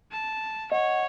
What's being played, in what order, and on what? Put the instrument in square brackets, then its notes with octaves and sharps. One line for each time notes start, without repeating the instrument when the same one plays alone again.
[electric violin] A5
[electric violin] C#5 [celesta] D#5 [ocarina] F#5